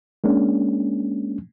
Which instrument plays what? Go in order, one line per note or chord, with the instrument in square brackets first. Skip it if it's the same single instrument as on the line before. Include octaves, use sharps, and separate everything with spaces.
[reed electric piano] G#3 A#3 C#4 D4